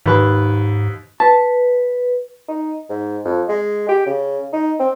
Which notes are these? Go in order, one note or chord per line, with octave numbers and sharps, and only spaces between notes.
D#2 G#2 B4
B4 A5
D#4
G#2
F2
G#3
G4
C#3
D#4
C4